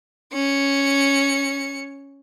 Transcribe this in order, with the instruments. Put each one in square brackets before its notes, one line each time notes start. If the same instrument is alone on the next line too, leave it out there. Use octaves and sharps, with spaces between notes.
[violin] C#4 C#7